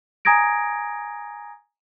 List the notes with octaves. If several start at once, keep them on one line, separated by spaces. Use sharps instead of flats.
G#5 A#5 D#6 G#6 A#6 D7